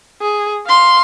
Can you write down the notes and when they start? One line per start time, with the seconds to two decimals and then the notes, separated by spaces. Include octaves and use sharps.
0.21 G#4
0.66 F5 C6